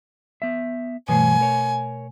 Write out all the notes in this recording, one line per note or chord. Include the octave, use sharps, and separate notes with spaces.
B3 E5
G2 B2 E3 A3 C#5 G#5
A#4 C#5